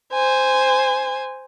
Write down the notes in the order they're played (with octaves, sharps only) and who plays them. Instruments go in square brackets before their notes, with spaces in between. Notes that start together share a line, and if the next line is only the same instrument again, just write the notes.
[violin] C5 G#5